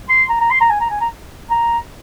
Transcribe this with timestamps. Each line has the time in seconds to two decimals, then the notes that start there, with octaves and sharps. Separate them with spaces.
0.09 C6
0.30 A#5
0.41 A#5
0.51 C6
0.61 A#5
0.70 G#5
0.81 A#5
0.90 G#5
1.01 A#5
1.51 A#5